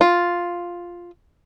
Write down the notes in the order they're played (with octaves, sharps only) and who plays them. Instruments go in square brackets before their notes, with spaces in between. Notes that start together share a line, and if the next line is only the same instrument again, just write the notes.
[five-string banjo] F4